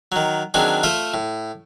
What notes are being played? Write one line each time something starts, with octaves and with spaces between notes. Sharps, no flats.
D#3 F#3
D#3 F#3 C4 D4 G#4
A3 F4 C5 E5
A2